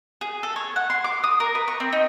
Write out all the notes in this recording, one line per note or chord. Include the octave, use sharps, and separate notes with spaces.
G#4
A4
C#5
F#5
C6
D6
D#6
A#4
B4
C#6
C4
D#4